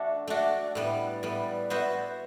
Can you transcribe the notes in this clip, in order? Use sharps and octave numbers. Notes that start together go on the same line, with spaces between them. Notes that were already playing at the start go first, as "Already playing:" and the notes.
Already playing: A3 D4 F#4
A3 D4 F#4 D5 F#5
A2 G3 B3 B4 D5
A2 G3 B3
B3 F#4 C5 E5